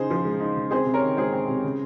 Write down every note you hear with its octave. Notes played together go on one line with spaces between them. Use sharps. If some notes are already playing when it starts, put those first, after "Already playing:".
Already playing: C#3 D#4 G#4 C5
F3
G#3
D#4
C#3
C4 G#4 C5
C3
A#4 C#5
D#3
G#3 G#4 C5
C4
C3
C#3